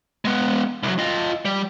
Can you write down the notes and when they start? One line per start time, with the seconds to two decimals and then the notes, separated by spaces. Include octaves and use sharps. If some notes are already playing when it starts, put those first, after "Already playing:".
0.25 G#3 B3
0.83 C2 F#3
0.98 F4 D#5
1.45 G3